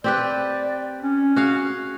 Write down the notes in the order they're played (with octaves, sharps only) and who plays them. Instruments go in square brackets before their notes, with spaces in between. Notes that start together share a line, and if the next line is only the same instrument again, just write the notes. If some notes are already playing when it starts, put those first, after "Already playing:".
[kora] C4 G4 B4 [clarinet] D5
[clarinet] C#4
[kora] F#4 G#4 F5